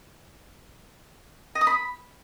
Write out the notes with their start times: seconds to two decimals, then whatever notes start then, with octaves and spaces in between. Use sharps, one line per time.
1.55 D#5
1.61 D#6
1.67 B5